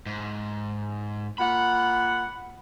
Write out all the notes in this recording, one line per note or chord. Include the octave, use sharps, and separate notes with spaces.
G#2
A#2 F#5 B5